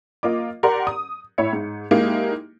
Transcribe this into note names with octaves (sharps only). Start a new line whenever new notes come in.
A#3 F4 D#5 D6
G4 A#4 D5 F#5 A#5 C6
D#6
A2 C#5 E5 B5 C#7
G#2
G#3 A#3 D#4 E4 G4